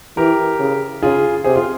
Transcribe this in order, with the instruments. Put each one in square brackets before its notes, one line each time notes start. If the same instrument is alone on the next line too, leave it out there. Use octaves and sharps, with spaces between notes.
[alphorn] E3 [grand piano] G4 A#4
[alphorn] C#3
[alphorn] C#3 [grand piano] F4 G#4
[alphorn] C3 [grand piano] G#4 C5
[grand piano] F4 G#4